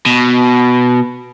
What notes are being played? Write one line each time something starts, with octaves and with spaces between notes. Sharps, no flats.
B2